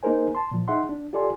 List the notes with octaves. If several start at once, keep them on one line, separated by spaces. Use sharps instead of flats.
A#3 D#4 G#4 A#4 C5 G#5
A5 C6
A#2 F3
D#4 G#4 E5 F#5 C6
D4
F4 G4 A4 D5 G#5 C6